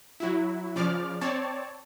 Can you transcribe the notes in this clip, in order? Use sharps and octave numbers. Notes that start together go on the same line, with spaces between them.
F#3 E4
C#3 F3 D5 D6 F6
C4 C#5 D5 A5